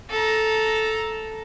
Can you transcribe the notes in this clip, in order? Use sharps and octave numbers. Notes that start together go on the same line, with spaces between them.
A4 A#5